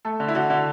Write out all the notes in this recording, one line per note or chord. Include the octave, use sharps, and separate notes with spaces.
A3 A4
D3
E4
D3 F#4
D3